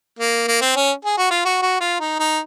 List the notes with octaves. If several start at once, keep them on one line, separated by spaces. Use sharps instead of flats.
A#3
A#3
C4
C#4
G#4
F#4
F4
F#4
F#4
F4
D#4
D#4